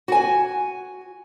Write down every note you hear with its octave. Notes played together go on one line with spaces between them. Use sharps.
F#4 G#5